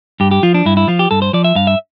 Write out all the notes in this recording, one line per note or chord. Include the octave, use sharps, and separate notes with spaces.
G2 G4
G4
F3 F4
D4
G2 E4
E4
F3 F4
G4
G2 A4
C5
F3 D5
E5
G2 F5
E5